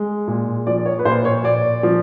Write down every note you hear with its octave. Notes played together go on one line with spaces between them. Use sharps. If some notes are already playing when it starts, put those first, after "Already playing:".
Already playing: G#3
A#2
F3 D5
C#5
B4
A#2 C5
C#5
A#2 D5
F3